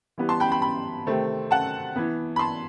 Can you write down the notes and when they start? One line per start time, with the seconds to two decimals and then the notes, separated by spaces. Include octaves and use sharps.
0.18 E3 G3 B3
0.29 A5 C6
0.40 G5 B5
0.52 G5 B5
0.62 G5 B5
1.07 C3 D#3 A3 C4
1.51 F#5 A5
1.96 E3 B3
2.36 B5
2.39 A5 C6